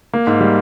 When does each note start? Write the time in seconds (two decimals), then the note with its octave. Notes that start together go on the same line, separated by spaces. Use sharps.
0.13 A#3
0.27 G#2
0.41 G3